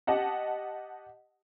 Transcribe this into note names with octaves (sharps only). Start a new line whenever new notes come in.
G4 D#5 F#5 A5